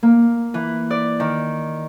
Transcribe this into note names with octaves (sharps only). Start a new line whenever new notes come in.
A#3
E3
D5
D#3